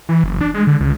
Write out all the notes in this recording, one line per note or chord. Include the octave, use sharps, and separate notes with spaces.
E3
F#1
D4
G#3
D3
C#2